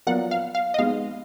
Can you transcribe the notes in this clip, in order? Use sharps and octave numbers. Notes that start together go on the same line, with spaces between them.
F#3 B3 F4 A#4 D5 F#5
F5
F5
D#5
G#3 B3 D#4 G#4 F5